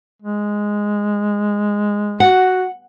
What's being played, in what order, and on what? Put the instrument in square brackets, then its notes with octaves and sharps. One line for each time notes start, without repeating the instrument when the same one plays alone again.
[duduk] G#3
[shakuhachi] F#4 [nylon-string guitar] F#5